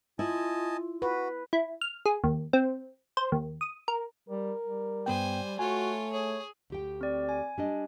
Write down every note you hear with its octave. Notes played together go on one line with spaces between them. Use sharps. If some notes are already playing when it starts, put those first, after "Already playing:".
E4 F4 D#5 G#5 A5
F#4 B4
E4
F6
G#4
D#2
C4
C5
D#2
D#6
A#4
G3 A#4
G3
G2 B3 C5 G5 G#5
A3 F4 F#4 C#5 G#5
G#4 C#5
D2 G4 G5
C4 D5
G#5
G3 D4 D#5